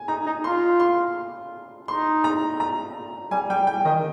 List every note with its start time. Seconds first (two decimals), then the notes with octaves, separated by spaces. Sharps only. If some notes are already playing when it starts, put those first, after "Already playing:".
Already playing: G#5
0.08 D#4 A#5
0.26 D#4
0.44 F4 C6
0.80 C6
1.88 D#4 C6
2.24 A#5
2.60 A#5
3.31 G3 G#5
3.49 G3 G5
3.67 G5
3.85 D#3 D#5